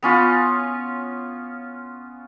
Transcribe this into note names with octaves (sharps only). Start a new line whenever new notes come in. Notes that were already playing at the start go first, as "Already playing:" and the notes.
B3 C#4 F4